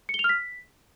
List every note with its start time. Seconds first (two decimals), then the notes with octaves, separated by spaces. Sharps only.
0.09 C#7
0.14 G7
0.19 F7
0.24 F6
0.29 B6